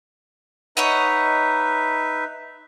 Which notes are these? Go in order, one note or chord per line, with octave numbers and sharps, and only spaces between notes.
D#4 B4 C#5 D#5 E5 F#5